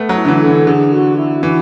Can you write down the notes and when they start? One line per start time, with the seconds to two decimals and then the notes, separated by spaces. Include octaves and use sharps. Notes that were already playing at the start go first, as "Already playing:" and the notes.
Already playing: A3 B3
0.09 F#3
0.15 E4
0.25 D3
0.28 E3
0.41 A4
0.48 D3
0.67 D3 G#4
0.93 F#4
1.17 E4
1.43 E3 F#4